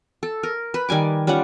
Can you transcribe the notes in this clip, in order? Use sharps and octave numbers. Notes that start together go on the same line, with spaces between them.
A4
A#4
B4
D#3 G3 G#5 D6
G3 C#4 F4 F#5